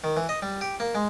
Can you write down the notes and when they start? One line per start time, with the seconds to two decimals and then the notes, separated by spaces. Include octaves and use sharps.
0.04 D#3
0.17 E3
0.29 D#5
0.42 G3
0.61 G4
0.80 A#3
0.95 G#3